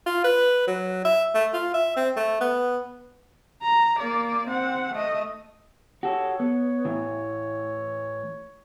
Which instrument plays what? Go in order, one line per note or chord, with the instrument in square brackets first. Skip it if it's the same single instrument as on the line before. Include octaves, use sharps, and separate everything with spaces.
[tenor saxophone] F4
B4
F#3
E5
A3
F4
E5
C4
A3
B3
[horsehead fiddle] A#5
A#3 D5
C4 F#5
A3 D#5
[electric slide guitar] F#4 G4 A4 [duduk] C#5
[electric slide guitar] B3
A2 E3